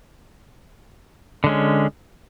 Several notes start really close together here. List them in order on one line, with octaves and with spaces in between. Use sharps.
D3 G#3 C#4